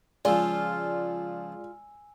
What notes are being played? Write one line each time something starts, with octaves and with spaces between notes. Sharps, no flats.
C#3 F3 G#3 F4 D5 G#5 E6